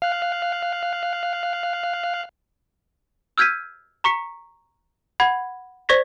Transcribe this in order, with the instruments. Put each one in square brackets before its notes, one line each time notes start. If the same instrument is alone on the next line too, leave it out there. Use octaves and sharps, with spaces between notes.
[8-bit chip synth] F5 F#6
[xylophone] E6 F6 G6 G#6 B6 D#7
A#5 C#6 B6 C#7
F#5 B5 G#6
C5 D5 C#6 G#6 A#6 B6